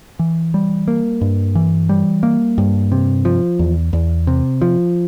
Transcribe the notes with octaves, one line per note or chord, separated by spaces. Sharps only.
E3
G3
A#3
G2
E3
G3
A#3
G2
C3
F3
E2
E2
C3
F3